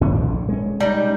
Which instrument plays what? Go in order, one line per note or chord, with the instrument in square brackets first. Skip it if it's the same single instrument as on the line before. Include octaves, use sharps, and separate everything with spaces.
[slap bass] D#2 A2 C#4
A#1 D3
G#3 C#4
[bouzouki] G3 D#4